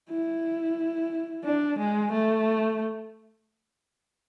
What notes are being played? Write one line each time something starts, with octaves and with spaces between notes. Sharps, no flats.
E4
D4
G#3
A3